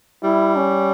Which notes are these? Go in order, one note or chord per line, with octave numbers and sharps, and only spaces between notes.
G3 E4
C#4